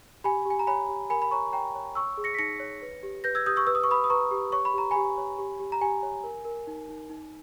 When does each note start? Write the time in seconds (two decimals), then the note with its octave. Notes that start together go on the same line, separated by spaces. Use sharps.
0.24 G4 G#5 B5
0.46 G4 G#5
0.59 A#5
0.67 C#5 G#5 B5
0.89 G4
1.10 A#4 G#5 B5
1.22 B5
1.31 C#5 A#5 C#6
1.53 C#5 G5 A#5
1.75 C#5
1.95 C#5 C#6 E6
2.17 G#4
2.24 A#6 C#7
2.34 B6
2.38 D#4 A#6 C#7
2.60 C#5
2.82 B4
3.03 G4
3.24 B4 G6 A#6
3.35 E6 G#6
3.46 G4 D#6 G6
3.56 C#6 E6
3.67 B4 E6
3.75 D#6
3.84 C#6
3.89 B4 B5 D#6
4.04 D#6
4.10 B4 A#5 C#6
4.31 G4
4.52 C#5 C#6
4.65 B5
4.74 G4 A#5
4.91 G4 G#5 B5
5.18 C#5
5.39 G4
5.60 G4
5.72 A#5
5.81 G4 G#5
6.03 C#5
6.23 A#4
6.45 A#4
6.67 D#4
6.89 D#4
7.10 D#4